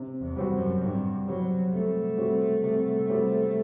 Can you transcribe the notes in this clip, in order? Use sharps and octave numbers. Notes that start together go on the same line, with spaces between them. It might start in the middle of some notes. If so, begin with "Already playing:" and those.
Already playing: C3
E2
G3 C4 F#4
F#2
G2 C3
F#3 G3 C4 F#4
C3 A3
G3 C4 F#4
C3
G3 C4 F#4